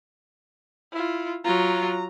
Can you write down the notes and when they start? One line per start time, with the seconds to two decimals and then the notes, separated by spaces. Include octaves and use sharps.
0.93 E4 F4
1.44 F#3 F4 A#5